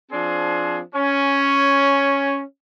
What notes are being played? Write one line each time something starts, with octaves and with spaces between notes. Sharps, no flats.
F3 C4 D4 G#4
C#4